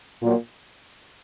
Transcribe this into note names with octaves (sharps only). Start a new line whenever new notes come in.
A#2 F#3